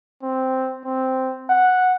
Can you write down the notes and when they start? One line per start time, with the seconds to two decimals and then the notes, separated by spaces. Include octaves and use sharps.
0.23 C4
0.85 C4
1.49 F#5